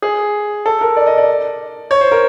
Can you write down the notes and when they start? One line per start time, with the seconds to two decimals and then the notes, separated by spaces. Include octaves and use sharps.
0.02 G#4
0.66 A4
0.81 A#4
0.97 D5
1.06 D#5
1.18 D5
1.91 C#5
2.01 C5
2.12 A#4